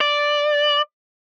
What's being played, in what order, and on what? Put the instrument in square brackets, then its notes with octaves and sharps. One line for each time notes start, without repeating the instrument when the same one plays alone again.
[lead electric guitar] D5